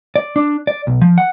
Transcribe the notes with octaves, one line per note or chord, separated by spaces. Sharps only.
D5
D4
D5
B1
F3
F#5